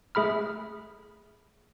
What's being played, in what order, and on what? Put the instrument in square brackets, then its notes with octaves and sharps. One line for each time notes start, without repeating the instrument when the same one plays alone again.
[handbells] A3 G#4 B5 F6